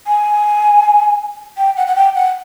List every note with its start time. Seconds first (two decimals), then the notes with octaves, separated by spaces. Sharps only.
0.07 G#5
1.57 G5
1.77 F#5
1.87 F#5
1.96 G5
2.15 F#5